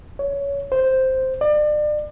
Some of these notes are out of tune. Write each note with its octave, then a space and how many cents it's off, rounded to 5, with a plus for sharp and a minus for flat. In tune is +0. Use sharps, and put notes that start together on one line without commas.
C#5 +20
C5 +0
D5 +35